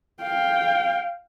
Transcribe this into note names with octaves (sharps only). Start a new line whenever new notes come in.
F5 G5